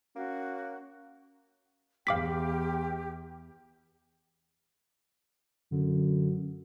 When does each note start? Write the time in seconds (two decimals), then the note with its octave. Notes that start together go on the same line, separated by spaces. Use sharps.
0.16 A#3 C#4 F#4
2.07 E2 G4 F5 G5 D6 B6
5.72 F#2 D3